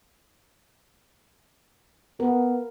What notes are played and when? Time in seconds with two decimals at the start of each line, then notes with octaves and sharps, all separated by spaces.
2.20 B3 A#4